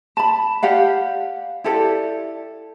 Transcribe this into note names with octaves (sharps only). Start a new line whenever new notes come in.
A5 B5
G4 D5 F5 F#5
E4 G4 A4 D5